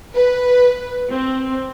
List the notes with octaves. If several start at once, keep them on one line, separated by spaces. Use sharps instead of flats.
B4
C4